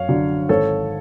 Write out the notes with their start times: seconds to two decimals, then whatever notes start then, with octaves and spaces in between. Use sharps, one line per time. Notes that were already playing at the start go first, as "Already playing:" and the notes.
Already playing: F#2 C#5 F5
0.09 D3 F#3
0.49 G#1 A4 C#5